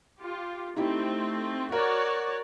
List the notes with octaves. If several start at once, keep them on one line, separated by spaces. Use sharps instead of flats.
F4 G4
A3 C4 D#4 E4 G4
F#4 A#4 C#5 D5